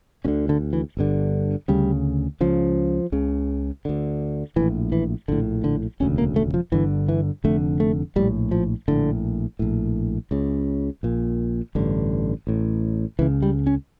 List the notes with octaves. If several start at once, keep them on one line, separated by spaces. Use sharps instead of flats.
D2 D3 C#4
D3
E3
G1 G2 D3
D2 C#3 G3
C#2 C#3 F3
C#2 C#3
D2 D3
A#1 A2 E3
E3
A#1 A2 D3
D3
E1 D2 C#3 C#4
A#3
A3
F3
G1 G2 D3 E3
E3
F1 F2 D3 A3
A3
A#1 A2 G3
F3
A#1 A2 D3
A#1 A2
C#2 C#3
A#1 A#2
A1 G2 D3
A1 A2
C#2 C#3 E3
G3
C#4